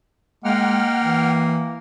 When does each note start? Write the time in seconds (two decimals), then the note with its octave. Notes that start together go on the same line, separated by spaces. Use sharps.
0.44 G#3 A#3 F#5 G5 F6
1.04 E3